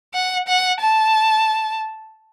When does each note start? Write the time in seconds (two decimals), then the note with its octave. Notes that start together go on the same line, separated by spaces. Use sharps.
0.14 F#5
0.48 F#5
0.80 A5